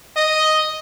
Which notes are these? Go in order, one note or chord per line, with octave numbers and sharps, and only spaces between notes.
D#5